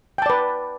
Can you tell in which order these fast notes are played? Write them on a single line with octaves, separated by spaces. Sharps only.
G5 A5 D5 B4